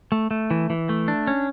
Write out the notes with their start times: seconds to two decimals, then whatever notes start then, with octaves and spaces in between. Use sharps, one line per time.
0.12 A3
0.31 A3
0.51 E3
0.70 E3
0.89 A3
1.08 D4
1.27 C#4